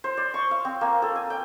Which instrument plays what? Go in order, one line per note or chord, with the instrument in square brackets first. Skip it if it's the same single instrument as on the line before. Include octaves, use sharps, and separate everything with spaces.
[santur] C5
D5
C#6
F5
C4
A#3
A4
G#5
G5